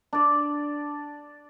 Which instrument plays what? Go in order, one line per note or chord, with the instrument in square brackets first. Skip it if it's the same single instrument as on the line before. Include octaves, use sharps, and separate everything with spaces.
[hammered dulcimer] D4 D5